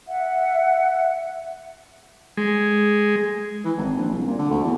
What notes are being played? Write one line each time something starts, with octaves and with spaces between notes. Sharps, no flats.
E5 F#5
G#3
E3
G#1
A#1
C2
A#2
D3
D2
E2